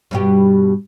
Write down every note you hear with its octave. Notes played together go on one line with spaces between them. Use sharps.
G2 B2 G4